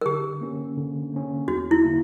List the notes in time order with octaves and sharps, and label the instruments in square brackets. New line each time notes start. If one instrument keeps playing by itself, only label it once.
[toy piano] A#4
[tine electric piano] D3 [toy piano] G4
[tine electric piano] A#3 C#4
D3
A#3 C#4
[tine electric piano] E2 [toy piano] F#4
[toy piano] E4
[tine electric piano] D3 A#3 E4